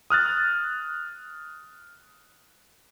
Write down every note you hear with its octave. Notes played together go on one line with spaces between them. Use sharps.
D#6 F6 F#6 A6